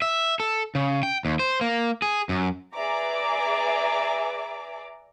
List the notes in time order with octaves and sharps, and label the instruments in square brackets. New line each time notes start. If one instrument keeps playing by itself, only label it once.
[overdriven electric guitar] E5
A4
C#3
G5
D#2
C5
A#3
G#4
F#2
[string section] G#4 B4 D5 E5 A#5 D6